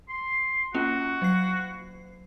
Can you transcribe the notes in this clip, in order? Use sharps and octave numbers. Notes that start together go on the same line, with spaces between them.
C6
A#3 C#4 F4 F#4
F#3 C7